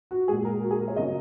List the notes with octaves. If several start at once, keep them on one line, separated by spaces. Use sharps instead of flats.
F#4
A#2 G#3 G#4
A#4
F#4
G#4
A#4
C#5
C#3 F#3 D#5